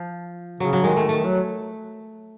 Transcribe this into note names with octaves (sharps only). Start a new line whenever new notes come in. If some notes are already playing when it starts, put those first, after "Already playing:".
Already playing: F3
C#3 F#3
F#3
D#3 G#3
A3
D#3 A3
F#3